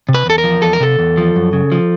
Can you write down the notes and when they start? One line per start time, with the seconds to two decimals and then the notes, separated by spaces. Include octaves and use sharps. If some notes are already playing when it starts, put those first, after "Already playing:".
0.09 C3
0.14 B4
0.26 E2 A4
0.38 A#4
0.44 F3
0.62 E2 A4
0.73 A#4
0.80 C3 A4
0.99 E2
1.18 F3
1.36 F#2
1.53 C#3
1.72 F3